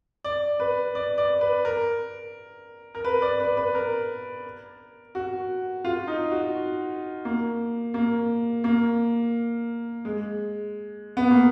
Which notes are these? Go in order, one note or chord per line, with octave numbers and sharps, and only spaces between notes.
D5
B4
D5
D5
B4
A#4
A#4
B4
D5
B4
B4
A#4
F#4
F4
D#4
F#4
A#3
A#3
A#3
G#3
B3
A#3